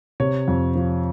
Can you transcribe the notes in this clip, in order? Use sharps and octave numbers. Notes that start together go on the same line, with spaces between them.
C3 C#5
F2
F3